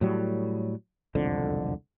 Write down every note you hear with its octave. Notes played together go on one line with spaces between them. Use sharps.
A2 F#3 G3
E1 C2 F2 D3